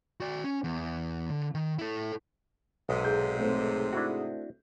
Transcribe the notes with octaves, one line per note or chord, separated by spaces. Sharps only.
F#4 D5
C#4
E2
D3
D#3
E4 A4
B1 G#2 C3 D#6
G#4 G6
A3 C4
D4 E4 F#4